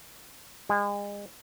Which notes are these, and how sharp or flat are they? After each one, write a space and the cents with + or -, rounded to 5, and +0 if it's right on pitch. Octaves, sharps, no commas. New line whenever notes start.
G#3 -35